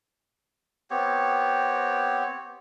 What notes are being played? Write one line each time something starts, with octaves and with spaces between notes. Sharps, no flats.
B3 C4 G4 C#5